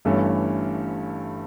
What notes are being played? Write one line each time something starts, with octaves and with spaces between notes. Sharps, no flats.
G1 G2 E3 A3 C#4